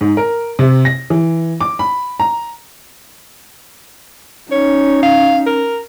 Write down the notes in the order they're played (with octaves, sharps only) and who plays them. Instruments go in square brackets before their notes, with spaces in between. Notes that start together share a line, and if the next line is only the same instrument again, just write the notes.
[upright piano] G#2
A#4
C3
A#6
E3
D6
B5
A#5
[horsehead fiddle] C#4 D#4 [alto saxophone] C#5
[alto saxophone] F5
A#4